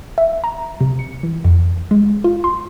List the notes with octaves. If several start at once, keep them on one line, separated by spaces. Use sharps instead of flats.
E5
A#5
C3
C#7
E3
F2
G#3
F4
C6